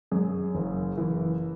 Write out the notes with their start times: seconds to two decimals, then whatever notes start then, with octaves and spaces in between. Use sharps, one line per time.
0.11 F#2 G#4
0.55 F#1
0.98 E3